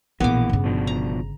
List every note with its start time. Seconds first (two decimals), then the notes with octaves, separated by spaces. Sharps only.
0.20 A#1 B2 E3 A#3 B3 D6
0.49 G1 C#3
0.64 B2 F3 D4
0.87 A#5